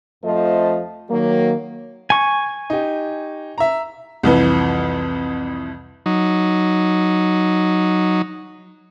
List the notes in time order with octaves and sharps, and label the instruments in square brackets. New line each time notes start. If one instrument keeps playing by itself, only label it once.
[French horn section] F2 F3 A3 A4 C5 D#5
D#3 F#3 A#3
[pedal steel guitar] G#5 C#6
[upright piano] D#4 G4
E5 A#5
[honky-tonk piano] C2 F2 E3
[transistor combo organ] F#3 D#4